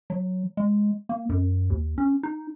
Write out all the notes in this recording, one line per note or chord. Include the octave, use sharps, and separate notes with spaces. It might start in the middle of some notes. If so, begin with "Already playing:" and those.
F#3
G#3
A#3
F#2
D#2
C#4
D#4